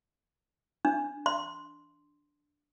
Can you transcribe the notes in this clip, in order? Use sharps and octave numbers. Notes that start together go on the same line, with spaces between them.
D4
C6